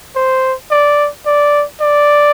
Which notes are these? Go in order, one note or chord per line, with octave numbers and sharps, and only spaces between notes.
C5
D5
D5
D5